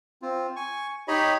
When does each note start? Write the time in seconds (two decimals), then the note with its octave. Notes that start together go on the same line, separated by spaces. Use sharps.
0.22 C4 F4
0.56 G#5 C#6
1.08 D#4 G4 C#5 D#5 B5